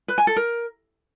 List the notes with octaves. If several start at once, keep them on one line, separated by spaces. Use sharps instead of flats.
B4
G#5
A4
A#4